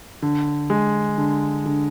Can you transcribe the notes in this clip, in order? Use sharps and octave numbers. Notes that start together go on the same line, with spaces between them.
D3
G#3
D3
D3